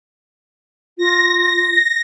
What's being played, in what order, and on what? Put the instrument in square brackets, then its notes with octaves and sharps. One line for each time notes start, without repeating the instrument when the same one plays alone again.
[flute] F4 [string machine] A#6